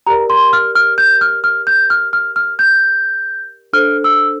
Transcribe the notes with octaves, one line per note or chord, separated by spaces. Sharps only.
G4 A#4 D5 A#5
C6
F6
F6
G6
F6
F6
G6
F6
F6
F6
G6
D4 A4 C5 F6
E6